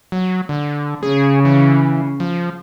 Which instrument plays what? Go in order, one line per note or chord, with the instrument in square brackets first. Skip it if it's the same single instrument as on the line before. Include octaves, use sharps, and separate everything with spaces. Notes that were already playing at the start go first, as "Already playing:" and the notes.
[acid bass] F#3
D3
[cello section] C#3 [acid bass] G#4
[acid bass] E3
F3